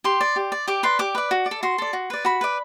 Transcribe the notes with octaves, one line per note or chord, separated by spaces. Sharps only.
G4 C6
D5
G4
D5
G4 D6
B4 D5 C6
G4 D6
B4 D5
F#4
D5
A4
F#4 C6
A4 D5
F#4
B4 D5
F#4 B5
B4 D5